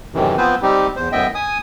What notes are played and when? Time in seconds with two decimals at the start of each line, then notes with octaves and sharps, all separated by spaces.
0.14 F#2 A2 C3 D#3 E3
0.38 F3 B3 C4 B4 C5
0.62 G3 C4 D#4 G4
0.96 E2 C5
1.12 F#2 A2 B3 D#5 E5 G5
1.35 G#5 D#6